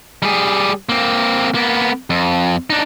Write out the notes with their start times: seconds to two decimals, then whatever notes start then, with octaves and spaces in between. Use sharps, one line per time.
0.22 G3 G#4
0.89 A#3 C4
1.55 A#3 B3
2.10 F2
2.70 D4 D#4